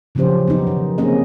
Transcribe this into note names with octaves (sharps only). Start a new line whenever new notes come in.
C#3 F3 F#3 C#4 G4 C5
B3 D#4
D#3 F#3
D3 A#3 C4 C#4 G#4 D#5